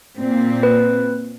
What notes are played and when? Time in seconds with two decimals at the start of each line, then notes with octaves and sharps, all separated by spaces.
0.20 A#2 C4
0.63 B4